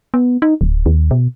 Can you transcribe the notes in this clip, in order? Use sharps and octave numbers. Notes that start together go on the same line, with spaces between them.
B3
D#4
D1
D#2
B2